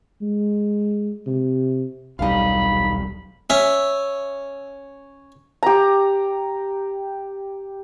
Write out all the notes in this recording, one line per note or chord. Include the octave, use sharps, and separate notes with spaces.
G#3
C3
D#1 B1 G3 D#4 F5 B5
C#4 E5
G4 A#5